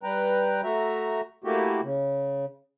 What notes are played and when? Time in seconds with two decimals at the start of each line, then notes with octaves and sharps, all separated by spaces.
0.03 G3 B4 G5 A#5
0.64 A3 F#4 E5 A#5
1.44 A3 A#3 E4 F#4 G4
1.83 C#3